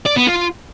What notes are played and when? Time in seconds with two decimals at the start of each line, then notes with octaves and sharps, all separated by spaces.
0.06 D5
0.17 B3
0.27 F4